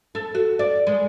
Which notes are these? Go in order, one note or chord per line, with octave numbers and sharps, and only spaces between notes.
A4
F#4
D5
G#3